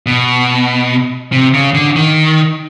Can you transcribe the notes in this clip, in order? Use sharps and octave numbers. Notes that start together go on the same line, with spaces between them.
B2
C3
C#3
D3
D#3